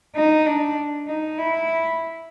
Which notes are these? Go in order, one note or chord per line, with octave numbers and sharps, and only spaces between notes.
D#4
D4
D#4
E4